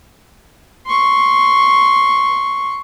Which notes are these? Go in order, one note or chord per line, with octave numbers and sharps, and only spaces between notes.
C6 C#6